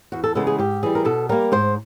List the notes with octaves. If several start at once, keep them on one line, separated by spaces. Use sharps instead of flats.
E2 F#4
A4
C#3 E3 G#3 B3 A4
G#4
G#2 G4
E3 G3 G#4
A#4
B2 A4
G3 A#3 A#4
G#2 C5